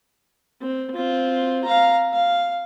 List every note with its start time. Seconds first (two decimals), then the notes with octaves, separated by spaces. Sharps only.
0.61 C4
0.94 C4 F4
1.64 F5 A#5
2.13 F5